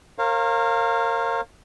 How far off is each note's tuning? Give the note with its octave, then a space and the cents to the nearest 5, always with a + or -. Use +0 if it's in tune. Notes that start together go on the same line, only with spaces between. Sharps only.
A#4 -20 C#5 -45 F5 +0